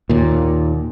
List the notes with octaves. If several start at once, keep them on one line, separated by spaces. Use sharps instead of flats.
D#2 A#2